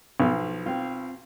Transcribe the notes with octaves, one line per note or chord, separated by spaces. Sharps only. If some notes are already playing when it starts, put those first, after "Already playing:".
B1 F3
C4 F4